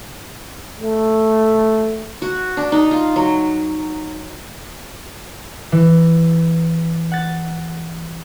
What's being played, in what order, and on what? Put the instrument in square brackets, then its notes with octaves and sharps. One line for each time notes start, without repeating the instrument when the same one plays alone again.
[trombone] A3
[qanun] F#4
D4
D#4
F4
F#3
[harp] E3
F#5 A6